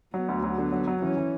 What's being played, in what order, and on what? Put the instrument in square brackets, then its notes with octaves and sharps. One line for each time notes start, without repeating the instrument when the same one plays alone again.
[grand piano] F#3 [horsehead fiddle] B3
[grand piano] D2
F#3
[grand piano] D3 [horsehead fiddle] B3
[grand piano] F#3
F#3
[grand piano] E3 [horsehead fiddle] C#4
[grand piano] E3